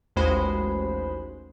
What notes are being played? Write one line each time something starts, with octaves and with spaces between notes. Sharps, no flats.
A1 D#2 G#3 F#4 C5 B5